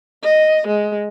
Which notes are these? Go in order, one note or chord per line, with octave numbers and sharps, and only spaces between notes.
D#5
G#3